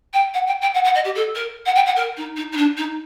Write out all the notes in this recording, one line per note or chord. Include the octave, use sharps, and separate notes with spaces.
G5
F#5
G5
G5
F#5
F#5
D#5
G4
A4
A#4
F#5
G5
F#5
A#4
D#4
D#4
D#4
D4
D#4